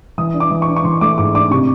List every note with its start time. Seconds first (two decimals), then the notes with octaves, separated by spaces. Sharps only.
0.18 E3 D#6
0.34 D4
0.40 D6
0.51 E3
0.62 C#6
0.68 D4
0.76 C#6
0.84 E3 C6
1.01 A3 D6
1.18 G#2 D6
1.34 D4 D6
1.51 C3 C#6